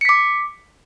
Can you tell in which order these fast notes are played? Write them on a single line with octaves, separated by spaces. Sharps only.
C#7 B6 D6